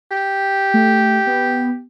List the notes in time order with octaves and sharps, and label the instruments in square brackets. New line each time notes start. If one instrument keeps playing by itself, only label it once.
[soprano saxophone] G4
[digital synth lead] A3
B3